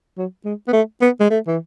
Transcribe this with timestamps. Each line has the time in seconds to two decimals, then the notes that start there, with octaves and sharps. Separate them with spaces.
0.17 F#3
0.45 G#3
0.68 B3
0.73 A3
1.02 B3
1.20 G#3
1.30 A3
1.47 E3